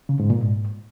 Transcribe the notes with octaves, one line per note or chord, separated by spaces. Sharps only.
C#3
G#2
A#2
G#2